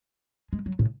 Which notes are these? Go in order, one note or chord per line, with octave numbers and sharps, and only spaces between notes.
G#3
F#3
A2